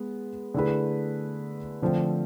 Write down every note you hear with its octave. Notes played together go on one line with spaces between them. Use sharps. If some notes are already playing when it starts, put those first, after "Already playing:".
Already playing: G#3 B3
D3 A3 E4 G#4 B4
D3 F3 A3 C4